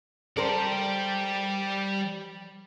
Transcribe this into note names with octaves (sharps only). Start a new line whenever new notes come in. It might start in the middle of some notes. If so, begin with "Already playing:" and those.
G3 A4 A#4 C5 D5